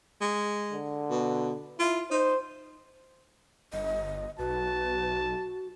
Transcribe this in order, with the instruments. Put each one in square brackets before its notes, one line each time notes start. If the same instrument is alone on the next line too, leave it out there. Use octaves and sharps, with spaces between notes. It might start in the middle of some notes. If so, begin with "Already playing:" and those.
[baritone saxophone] G#3
[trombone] D3
[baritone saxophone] B2
[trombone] E4 [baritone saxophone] F4
[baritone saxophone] D#4 [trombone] C5
[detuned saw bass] G1 [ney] D#5
[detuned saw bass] B1 [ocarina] F#4 [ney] B4 [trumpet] A5